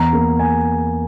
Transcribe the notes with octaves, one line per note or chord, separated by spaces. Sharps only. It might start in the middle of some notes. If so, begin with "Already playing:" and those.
Already playing: E2 B3 A#5
A#3
G#5